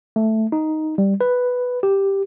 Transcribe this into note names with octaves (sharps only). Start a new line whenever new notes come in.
A3
D#4
G3
B4
G4